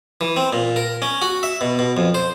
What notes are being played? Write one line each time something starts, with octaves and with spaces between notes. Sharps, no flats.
E3
C4
A#2
A#4
C#4
F#4
E5
B2
B2
F2
C5